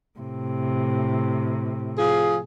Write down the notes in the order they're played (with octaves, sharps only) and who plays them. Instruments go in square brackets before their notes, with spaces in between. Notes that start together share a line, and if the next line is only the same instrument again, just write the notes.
[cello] A2 C3
[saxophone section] F3 G#4